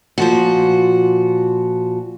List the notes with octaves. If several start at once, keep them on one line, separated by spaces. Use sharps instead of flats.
A#2 F3 F#4